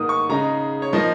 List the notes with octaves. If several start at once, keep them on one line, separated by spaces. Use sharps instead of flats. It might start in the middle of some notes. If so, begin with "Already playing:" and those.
Already playing: G#2 D#3 A#3 D#4 D#6
C#6
C#3 G#3 D#4 A#5
C#5
F3 A#3 D#4 D#5